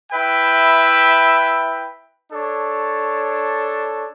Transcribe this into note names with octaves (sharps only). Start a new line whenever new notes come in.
E4 B4 E5 G5
D4 A4 C#5